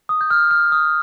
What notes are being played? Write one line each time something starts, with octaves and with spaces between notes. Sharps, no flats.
D#6
G6
F6
F6
D#6